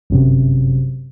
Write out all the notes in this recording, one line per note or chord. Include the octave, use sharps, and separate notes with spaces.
G1 F#2 C3